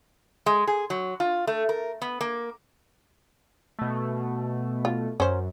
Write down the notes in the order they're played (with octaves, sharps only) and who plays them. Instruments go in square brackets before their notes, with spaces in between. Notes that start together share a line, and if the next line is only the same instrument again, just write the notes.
[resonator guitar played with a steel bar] G#3
G#4
F#3
F4
A3
A#4
B3
A#3
[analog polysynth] B2 A3
[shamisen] F4
[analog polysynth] F#2 [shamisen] C#4 C5